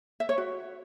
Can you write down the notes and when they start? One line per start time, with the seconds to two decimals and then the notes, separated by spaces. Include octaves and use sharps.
0.20 E5
0.29 C#5
0.38 F#4